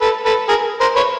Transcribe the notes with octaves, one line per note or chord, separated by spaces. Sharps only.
A4 B4
A4 B4
G#4 A#4
A#4 C5
B4 C#5